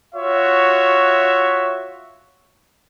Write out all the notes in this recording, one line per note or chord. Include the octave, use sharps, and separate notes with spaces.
F4 F#4 C#5 E5